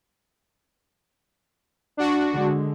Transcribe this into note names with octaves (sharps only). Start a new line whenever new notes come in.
D4 F#4
D3 G#3